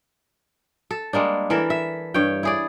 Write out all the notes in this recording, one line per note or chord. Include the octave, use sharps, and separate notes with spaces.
A4
G3 G#3 A#3 D4
E3 E4 A4 A#4
E5
G2 C#5 G5
E4 G#4 D5